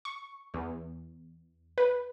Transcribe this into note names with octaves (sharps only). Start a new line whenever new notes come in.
C#6
E2
B4